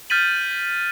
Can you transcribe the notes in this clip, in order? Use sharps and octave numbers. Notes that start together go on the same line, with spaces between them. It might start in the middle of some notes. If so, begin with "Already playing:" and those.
F6 G6 A6 B6 D#7 F#7